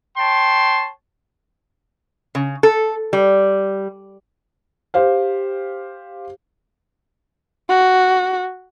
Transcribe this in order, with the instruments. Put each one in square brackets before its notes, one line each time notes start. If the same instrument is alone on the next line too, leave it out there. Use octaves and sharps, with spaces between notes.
[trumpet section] C#5 G5 A5 C6
[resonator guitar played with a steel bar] C#3
A4
G3
[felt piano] G4 C5 F5
[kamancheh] F#4